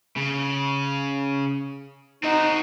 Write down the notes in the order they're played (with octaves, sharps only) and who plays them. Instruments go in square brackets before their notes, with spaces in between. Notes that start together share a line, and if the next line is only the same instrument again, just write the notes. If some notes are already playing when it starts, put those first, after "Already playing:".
[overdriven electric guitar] C#3
[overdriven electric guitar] C4 F#4 [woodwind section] D#4